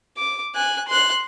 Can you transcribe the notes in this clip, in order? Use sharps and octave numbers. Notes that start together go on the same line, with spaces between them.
D6
G#5 F#6
C6 F#6